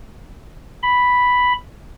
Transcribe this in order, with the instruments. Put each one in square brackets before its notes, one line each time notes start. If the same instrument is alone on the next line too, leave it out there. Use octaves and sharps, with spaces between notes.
[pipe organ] B5